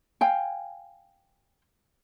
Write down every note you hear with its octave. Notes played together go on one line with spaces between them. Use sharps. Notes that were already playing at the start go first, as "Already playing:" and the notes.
F5 G5 G#5